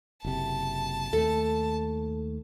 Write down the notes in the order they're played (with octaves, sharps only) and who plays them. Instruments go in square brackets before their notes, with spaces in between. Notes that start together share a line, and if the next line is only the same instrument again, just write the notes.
[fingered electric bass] F#1 C3 [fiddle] A5
[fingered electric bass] D#2 A3 [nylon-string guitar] A4